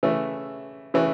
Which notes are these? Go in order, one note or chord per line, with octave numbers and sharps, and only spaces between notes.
C#3 E3 A3
C#3 E3 A3